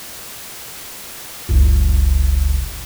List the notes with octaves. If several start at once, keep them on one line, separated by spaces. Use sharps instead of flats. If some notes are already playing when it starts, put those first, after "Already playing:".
F#1 C#2